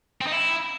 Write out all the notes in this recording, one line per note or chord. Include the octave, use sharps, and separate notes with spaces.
C4
D#4
E4